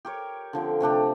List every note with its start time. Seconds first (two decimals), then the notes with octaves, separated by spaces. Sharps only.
0.05 G4 A#4 C#5
0.53 D3 F3 C4
0.81 C3 A3 D4 G4